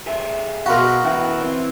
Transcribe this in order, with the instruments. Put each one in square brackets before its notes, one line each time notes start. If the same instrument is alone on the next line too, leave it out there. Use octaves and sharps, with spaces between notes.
[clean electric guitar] G4 G#4 E5
[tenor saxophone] B2 [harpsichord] F#4 A#4 [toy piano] F5 B5 C6
[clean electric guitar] B2 E4 [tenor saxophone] E3 [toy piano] C#4
[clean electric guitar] C4